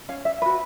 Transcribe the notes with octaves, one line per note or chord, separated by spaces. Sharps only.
C#4 F5
E5
F#4 B4